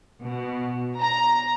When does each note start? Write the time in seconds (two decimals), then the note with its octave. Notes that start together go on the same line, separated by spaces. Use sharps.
0.22 B2
0.99 A#5